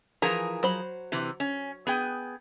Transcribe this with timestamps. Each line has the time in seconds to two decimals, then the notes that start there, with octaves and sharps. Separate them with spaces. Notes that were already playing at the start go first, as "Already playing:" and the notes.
0.22 E3 F3 G#4 A#4 A#5
0.63 F#3 C5 B5
1.12 C3 E3
1.40 C#4
1.87 B3 G#4 G5